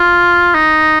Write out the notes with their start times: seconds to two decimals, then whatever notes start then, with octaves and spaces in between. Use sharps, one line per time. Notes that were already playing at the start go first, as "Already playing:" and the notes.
Already playing: F4
0.55 D#4